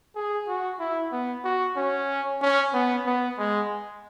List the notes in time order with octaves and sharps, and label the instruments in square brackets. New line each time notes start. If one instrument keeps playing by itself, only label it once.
[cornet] G#4
F#4
E4
B3
F#4
C#4
C#4
B3
B3
G#3